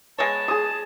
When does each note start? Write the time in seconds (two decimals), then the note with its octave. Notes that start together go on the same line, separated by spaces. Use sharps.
0.18 G#3 B3 C#5 A5
0.48 G#4 D#6